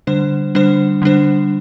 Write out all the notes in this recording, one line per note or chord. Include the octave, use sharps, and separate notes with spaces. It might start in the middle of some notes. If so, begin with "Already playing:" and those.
D3 G3 D4 C5
D3 G3 D4 C5
D3 G3 D4 C5